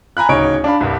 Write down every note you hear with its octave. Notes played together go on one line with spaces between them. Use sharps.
G#5 A#5 B5 F#6
D1 C#3 C#4 D#4 C#5 D7
D4 F5 B5
C2 G2